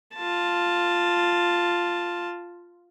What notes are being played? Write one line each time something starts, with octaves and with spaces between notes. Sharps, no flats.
F4 A5